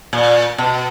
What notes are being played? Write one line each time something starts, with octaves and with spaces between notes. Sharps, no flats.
A#2
B2